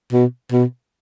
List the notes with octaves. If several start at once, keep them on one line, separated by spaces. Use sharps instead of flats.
B2
B2